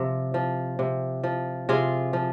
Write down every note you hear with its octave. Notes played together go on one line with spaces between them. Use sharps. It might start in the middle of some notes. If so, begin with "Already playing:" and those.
Already playing: C3 F3
F3
C3
F3
C3 F4 G#4
F3